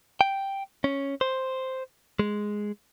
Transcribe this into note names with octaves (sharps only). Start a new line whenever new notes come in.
G5
C#4
C5
G#3